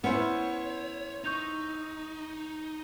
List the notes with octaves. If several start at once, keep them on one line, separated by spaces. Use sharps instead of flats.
B3 C#4 E4 C5 C#5
D#4 C#6 G6 F7